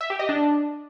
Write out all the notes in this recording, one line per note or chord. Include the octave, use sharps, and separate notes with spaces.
E5
G4
D#5
D4